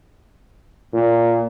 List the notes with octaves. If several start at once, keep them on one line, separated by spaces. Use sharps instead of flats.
A#2